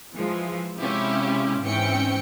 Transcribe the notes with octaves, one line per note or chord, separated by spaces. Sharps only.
E3 F3 G#3
C3 G#3 C#4 E4 F4 G4
G#2 E3 C4 C#4 G5 C#7